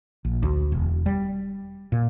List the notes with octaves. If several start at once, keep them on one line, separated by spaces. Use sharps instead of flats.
A#1
D2
E1
G3
A#2